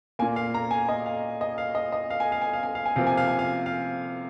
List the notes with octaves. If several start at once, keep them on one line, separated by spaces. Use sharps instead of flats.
A#2 A#3 G#5
F5
A#5
G#5
D#5
F5
D#5
F5
D#5
D#5
F5
G#5
F5
G#5
F5
G#5
F5
G#5
C3 F3 A#3 F5
G#5
F5
G#5
F5
F5